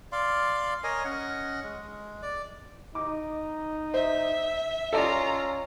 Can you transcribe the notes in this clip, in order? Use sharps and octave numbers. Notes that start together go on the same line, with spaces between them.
D5 F5 C6
A#4 C#5 D#5 G#5
C#4 D#5 F#5
G#3
D5
D#4 D6
C5 E5
C#4 F4 A4 D5 D#5 A#5